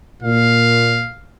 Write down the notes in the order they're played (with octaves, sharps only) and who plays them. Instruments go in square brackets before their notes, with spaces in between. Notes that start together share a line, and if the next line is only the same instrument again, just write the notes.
[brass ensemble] A#2 [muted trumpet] F5